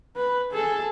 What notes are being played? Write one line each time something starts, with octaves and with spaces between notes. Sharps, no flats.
B4
G#4 A4